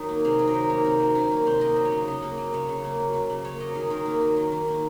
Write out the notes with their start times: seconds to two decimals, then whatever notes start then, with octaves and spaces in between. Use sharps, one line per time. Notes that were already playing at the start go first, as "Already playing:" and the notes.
Already playing: D#3 F#3 D#4
0.09 A#3
0.25 C3 G#4
0.39 F#3
0.47 A#4
0.54 D#3
0.70 A#3 C#5
0.85 C3 A#4
1.00 F#3
1.15 D#3 C#4
1.32 A#3
1.46 C3 C5
1.61 A#3 D#5
1.76 F#3
1.85 C#5
1.92 C#3
2.07 C#3 D#5
2.22 A#3
2.37 F#3
2.53 C#3 C#5
2.69 C#3
2.84 A#3
3.00 F#3
3.14 C#3
3.30 C#3
3.45 A#3 C#5
3.60 F#3 D#5
3.75 D#3 G#4
3.90 D#3 A#4
4.06 A#3
4.21 F#3
4.36 D#3
4.52 D#3
4.68 A#3